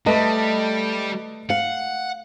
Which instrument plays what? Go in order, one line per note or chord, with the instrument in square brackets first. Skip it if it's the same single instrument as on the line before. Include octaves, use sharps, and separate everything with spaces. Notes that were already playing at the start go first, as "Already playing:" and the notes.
[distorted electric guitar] G3 [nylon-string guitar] A3 [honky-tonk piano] B4 D#5 A5
[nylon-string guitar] F5 [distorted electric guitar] F#5